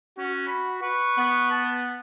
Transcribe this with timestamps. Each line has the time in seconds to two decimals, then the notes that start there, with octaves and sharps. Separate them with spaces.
0.18 C#4 F#4
0.47 B5
0.82 B4 C#6
1.18 B3
1.50 A5